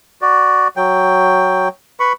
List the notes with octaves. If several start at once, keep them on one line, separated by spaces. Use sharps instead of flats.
F#4 D5
F#3 G5
B4 B5 C#6